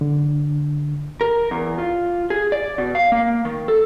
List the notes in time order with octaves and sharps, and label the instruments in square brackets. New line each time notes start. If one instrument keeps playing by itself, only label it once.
[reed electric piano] D3
[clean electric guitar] A#4
E2
F4
G#4
D5
B2
F5
A#3
D#3
A4